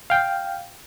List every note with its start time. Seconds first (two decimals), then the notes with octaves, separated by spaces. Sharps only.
0.10 F5 G5